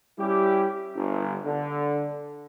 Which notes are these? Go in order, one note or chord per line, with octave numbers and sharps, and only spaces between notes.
G3 C#4 E4 G4
G1
D3